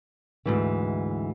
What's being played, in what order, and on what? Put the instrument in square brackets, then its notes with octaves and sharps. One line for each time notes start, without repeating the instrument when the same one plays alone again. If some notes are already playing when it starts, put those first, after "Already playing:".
[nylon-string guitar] D2 G#2 E3